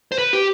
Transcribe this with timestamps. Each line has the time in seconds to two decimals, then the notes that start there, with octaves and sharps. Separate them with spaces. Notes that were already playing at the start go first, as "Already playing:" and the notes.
0.12 C5
0.18 B4
0.33 G4